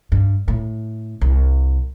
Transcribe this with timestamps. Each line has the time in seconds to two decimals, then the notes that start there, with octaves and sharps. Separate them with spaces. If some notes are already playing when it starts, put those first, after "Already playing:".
0.12 G2
0.48 A2
1.21 C2